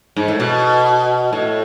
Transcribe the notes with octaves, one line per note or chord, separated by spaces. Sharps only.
G#2
A2
B2
A2